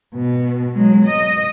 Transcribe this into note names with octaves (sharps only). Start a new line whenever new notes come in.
B2
F#3 G#3
D#5